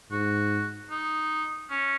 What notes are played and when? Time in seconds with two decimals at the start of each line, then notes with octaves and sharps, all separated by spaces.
0.11 G#2 F#4
0.90 D#4
1.70 C#4